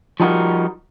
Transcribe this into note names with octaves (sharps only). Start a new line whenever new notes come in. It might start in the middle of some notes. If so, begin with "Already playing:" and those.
F3 G3 D#4 F#4 A#4